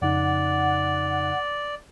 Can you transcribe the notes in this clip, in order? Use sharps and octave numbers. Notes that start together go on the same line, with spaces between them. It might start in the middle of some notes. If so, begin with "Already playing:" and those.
F2 C#3 D#4 D5 F#5